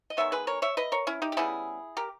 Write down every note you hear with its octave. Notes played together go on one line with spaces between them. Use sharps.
D#5
D#3 G#3 B3 C#5 E5
G#4 B4
A#4 C#5
C#5 E5
B4 D#5
A#4 C#5
C#4 E4
D#4 G4
G4
C#3 G3 B3 E4 G#4
G4 A#4